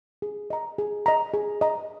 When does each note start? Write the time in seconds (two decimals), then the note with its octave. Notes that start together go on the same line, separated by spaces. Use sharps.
0.22 G#4
0.50 D#5 A#5
0.78 G#4
1.06 D#5 A#5
1.34 G#4
1.61 D#5 A#5